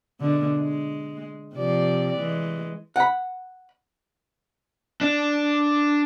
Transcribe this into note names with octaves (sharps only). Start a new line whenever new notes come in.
B2 D3 G#3
G#3
C3 F3 D5
E3 G#3
F#5 B5
D4